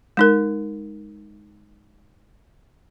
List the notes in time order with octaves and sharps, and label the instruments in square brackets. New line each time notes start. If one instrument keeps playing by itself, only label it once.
[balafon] G#3 D#4 A#4